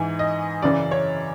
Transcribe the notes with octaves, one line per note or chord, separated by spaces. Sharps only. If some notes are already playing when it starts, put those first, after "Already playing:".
Already playing: G#2 E3 G#5
D#5
F#2 C#3 E3 D5
C#5